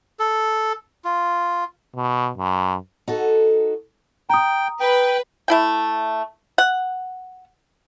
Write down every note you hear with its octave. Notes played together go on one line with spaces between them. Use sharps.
A4
F4
B2
F#2
D#4 F#4 A4
G5 A#5 D#6
B4 G5
A3 E4 G5
F#5